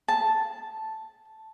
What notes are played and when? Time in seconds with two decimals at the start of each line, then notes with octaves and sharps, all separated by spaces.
0.08 A5